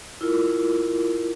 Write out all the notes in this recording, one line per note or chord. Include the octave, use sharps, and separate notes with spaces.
E4 F4 A#4